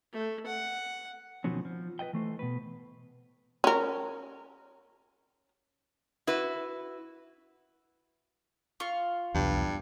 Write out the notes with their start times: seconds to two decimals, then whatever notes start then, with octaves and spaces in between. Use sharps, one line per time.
0.13 A3
0.47 F#5
1.44 B2 D#3 F3 F#3 C4 C#4
1.65 F3
1.99 B4 D5 D#5 G5
2.13 E3 A3 C5
2.39 B2 B4
3.64 C#4 A#4
6.27 E4 F#4 B4
8.80 F4 C#6
9.34 B1 E2 G2